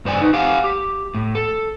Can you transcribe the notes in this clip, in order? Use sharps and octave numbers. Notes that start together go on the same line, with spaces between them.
G2 C5 D5 G#5
D#4 B4
G4 C5 F5 F#5 G#5
G4
A2
A4